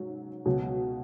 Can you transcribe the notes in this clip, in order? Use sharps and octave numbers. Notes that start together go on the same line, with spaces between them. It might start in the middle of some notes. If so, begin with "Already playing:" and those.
Already playing: G#2 F#3
C#2 B2 F#3